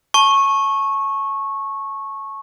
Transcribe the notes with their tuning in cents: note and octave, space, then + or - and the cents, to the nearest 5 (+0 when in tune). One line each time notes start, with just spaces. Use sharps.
A5 -15 C#6 -15